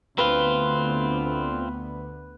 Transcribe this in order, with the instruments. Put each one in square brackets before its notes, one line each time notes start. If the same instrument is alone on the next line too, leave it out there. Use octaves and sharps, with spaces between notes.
[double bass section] D2 D3 B3 [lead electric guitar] C4 F4 [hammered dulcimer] B4